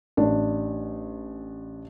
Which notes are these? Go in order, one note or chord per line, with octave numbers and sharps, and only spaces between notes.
A1 D4